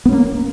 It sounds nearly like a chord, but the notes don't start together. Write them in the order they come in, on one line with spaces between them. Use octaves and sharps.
B3 C#4 A#3